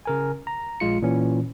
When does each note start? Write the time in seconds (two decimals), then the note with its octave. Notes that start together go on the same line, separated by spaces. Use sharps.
0.06 C#3 A#4 G#5
0.47 A#5
0.80 A#1 G#3 F4 C#7
1.02 A#2 E3 C#4